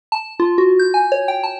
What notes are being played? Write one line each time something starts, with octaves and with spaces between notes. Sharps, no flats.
A5
F4
F#4
G6
G#5
C#5
G5
A5